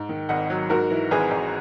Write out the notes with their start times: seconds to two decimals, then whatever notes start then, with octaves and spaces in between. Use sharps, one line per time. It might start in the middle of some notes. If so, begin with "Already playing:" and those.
Already playing: G#2
0.09 D#3
0.29 G#1 D#5 F#5
0.50 F#3
0.70 G#2 F#4 A#4
0.91 E3
1.11 G#1 G#4 B4
1.31 G#1